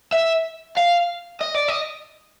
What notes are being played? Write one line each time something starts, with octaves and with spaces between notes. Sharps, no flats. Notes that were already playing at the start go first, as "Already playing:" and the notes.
E5
F5
D#5
D5
D#5